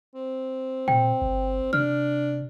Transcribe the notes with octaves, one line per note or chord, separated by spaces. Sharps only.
C4
A#2 G5
G1
C3 D4 F6